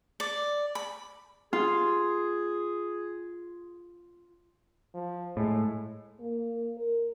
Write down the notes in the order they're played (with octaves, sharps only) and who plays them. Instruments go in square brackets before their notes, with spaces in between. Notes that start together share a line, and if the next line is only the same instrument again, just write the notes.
[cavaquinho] D5
B5
[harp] F4 [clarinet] G#4
[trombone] F3
[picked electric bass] A2 [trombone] G#3
[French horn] A#3
A#4